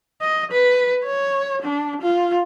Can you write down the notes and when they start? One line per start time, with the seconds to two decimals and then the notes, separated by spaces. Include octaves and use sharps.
0.22 D#5
0.52 B4
1.04 C#5
1.62 D4
2.02 F4